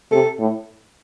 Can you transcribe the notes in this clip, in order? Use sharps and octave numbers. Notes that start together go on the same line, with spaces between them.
C3 A4
A2